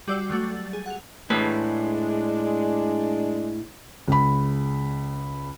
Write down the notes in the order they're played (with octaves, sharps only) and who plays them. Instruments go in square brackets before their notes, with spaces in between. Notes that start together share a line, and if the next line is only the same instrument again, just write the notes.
[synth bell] G3 F#4 G4 D5 E6 C7
F#3 G3 A3 F#4
A6
G#4
F#5 F7
[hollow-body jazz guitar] A2 B4 [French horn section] G#3 D4
[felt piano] C#2 B5